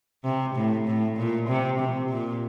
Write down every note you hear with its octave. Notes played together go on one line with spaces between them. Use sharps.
C3
A2
A2
A#2
C3
C3
A#2